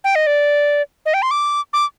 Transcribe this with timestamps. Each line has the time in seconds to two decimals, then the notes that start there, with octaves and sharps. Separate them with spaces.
0.04 G5
0.15 D#5
0.27 D5
1.06 D#5
1.14 G5
1.22 C6
1.31 D6
1.73 D6